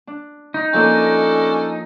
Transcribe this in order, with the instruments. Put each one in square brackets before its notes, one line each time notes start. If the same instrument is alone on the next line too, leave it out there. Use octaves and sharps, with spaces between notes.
[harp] D4
[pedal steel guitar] D#4
[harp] F3 A#3 C#5 [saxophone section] C#4 D4 A4